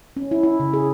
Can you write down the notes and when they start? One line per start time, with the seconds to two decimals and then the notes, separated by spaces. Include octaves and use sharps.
0.17 C#4
0.31 E4
0.43 E4
0.60 C#3
0.74 G#4